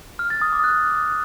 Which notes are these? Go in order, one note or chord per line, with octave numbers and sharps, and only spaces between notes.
F6
A6
D#6
D6
F#6